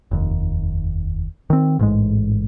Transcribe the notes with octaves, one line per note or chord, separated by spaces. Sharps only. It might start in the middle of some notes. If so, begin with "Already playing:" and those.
F1 D#2
D#3 C4
A1 G#2 G#3